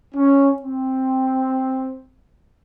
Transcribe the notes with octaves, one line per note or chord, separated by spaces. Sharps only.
C#4
C4